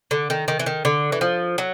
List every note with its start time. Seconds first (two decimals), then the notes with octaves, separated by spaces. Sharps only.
0.11 D3
0.30 D#3
0.48 D#3
0.59 E3
0.66 D#3
0.85 D3
1.12 E3
1.21 F3
1.58 F#3